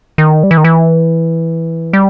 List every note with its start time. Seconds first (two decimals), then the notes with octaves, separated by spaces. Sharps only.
0.18 D#3
0.43 G3
0.51 E3
0.57 D#3
0.64 E3
1.93 G3